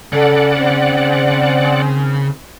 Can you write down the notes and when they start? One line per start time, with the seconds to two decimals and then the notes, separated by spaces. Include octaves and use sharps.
0.13 C#3 A4 D5 F#5
0.57 D#3 C4